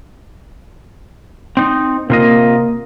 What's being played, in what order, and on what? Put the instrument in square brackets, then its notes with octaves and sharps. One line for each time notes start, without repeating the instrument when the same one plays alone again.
[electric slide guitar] C4 D#4
[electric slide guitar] C3 F4 D#5 [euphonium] A#3